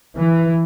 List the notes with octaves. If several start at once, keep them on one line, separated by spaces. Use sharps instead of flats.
E3